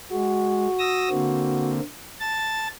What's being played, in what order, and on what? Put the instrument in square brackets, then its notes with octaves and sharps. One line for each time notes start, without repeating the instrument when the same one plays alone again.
[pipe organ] G#3 [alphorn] F#4
[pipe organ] D#6 E6 A#6
D3 A#3 C4
A5 A6